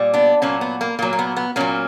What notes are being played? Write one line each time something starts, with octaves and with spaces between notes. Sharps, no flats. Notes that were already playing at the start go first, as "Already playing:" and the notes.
Already playing: A#2 G3
B3 D4
A#2 F#3 A#3 C#4
B3
A#3
A#2 F#3 A#3
A#3
B3
B3
A#2 F#3 A#3 C#4